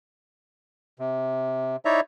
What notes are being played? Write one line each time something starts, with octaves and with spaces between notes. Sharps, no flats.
C3
D#4 E4 C#5 D5 E5 A#5